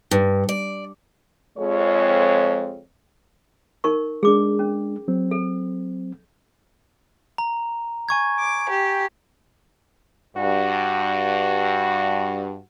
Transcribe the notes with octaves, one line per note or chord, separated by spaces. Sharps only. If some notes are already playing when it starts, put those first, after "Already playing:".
G2
D5
F2 G#3 C#5
D#4 A#4 C#6
G#3 D4 G#4 D6
C#4
F#3 C4
A4
A#5
G#5 C#6 G#6
D6
G4
G2 F#4